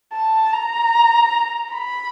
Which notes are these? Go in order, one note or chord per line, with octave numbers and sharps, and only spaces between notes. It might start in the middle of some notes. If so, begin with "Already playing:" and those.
A5
A#5
B5